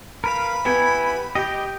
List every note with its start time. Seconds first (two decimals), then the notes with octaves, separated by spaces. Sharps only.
0.24 A#4 B4 F5 B5
0.65 B3 E4 G4 G#5
1.35 G4 D#5 G5